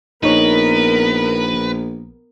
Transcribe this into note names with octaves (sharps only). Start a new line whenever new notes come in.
A#1 B3 D#4 A#4 B4 C#5